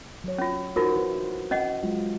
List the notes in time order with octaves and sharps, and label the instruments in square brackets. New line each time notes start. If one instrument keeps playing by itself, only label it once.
[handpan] F#3 C#5
[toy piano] C#4 F4
[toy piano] D#4 F4 A#4 [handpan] F#4 C5
[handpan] E4 B4
[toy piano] C#4 D#5 F#5
[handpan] F#3 G#3 F4